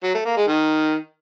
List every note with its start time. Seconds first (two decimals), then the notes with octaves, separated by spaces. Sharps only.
0.04 F#3
0.15 A3
0.26 A#3
0.37 G#3
0.48 D#3